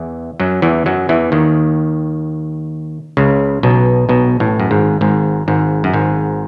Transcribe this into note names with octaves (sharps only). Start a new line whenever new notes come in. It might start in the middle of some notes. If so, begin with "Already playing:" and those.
Already playing: E2 E3
F#2 F#3
E2 E3
F#2 F#3
E2 E3
D#2 D#3
C#2 C#3
B1 B2
B1 B2
A1 A2
F#2
G#1 G#2
G#1 G#2
G#1 G#2
F#2
G#1 G#2